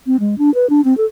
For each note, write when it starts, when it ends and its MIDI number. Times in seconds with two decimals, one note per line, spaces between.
0.07 0.16 60
0.20 0.38 56
0.38 0.53 62
0.54 0.69 71
0.70 0.81 62
0.85 0.96 60
0.97 1.05 69